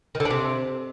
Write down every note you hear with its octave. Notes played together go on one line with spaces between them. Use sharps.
D#3
D3
D4
C3